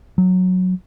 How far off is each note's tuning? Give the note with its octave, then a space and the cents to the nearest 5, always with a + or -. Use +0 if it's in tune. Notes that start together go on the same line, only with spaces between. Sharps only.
F#3 -10